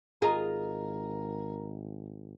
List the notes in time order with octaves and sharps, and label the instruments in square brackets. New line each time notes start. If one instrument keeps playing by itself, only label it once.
[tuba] G#1 [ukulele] F4 D#5 A#5 [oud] G#4 [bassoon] A#4